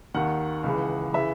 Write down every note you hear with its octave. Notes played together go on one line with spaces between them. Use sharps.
D#2 D#3 F#5
C#2 C#3 E3
C#3 E3 E5